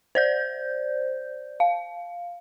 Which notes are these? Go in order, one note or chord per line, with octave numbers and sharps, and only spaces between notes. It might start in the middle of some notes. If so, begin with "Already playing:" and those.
C5 D5 G6
F5